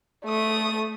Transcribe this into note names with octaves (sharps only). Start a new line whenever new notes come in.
A3 D#6